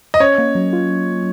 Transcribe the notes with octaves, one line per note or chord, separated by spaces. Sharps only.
D#5
C#4 C#5
A#3
F#3
F4